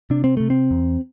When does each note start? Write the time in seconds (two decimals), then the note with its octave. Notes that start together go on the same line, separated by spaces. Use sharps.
0.10 C3 D4
0.24 C4
0.37 C3 A3
0.50 C4
0.71 E2